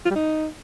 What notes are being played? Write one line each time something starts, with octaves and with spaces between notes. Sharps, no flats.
F4
G3
D#4